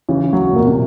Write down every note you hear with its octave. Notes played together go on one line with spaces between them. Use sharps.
C#3 E3
F#3
A#2
B2 A#3
C3